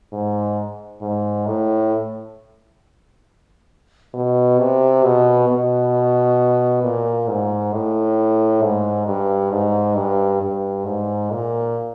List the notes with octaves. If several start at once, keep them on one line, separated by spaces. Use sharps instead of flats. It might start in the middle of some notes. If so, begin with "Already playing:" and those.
G#2
G#2
A2
B2
C3
B2
B2
A#2
G#2
A2
G#2
G2
G#2
G2
G2
G#2
A#2